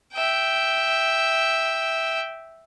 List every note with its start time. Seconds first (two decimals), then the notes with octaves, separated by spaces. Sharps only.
0.14 E5 G5